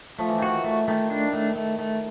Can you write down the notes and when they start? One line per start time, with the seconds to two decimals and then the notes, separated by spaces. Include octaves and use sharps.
0.19 F3 A3
0.29 E3
0.38 D#3 F#4
0.48 E3
0.64 A3
0.88 D#3 A3
1.10 D4
1.33 A3
1.56 A3
1.79 A3